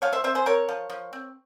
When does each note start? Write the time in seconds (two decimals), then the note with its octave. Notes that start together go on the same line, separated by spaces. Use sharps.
0.02 F3 C#5 F5
0.12 C5 E5
0.24 C4 C5 E5
0.35 G#4 C5
0.46 C4 A#4 C#5
0.69 F3
0.90 F3
1.13 C4